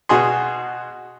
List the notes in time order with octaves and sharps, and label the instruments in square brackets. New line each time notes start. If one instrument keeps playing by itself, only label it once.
[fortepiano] B2 F#4 G#4 C6